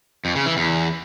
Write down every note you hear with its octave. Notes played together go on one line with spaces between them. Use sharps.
F2
C#3
E3
E2